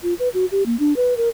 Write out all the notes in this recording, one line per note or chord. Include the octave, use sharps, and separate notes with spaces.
F4
B4
F#4
G4
A#3
D4
B4
A#4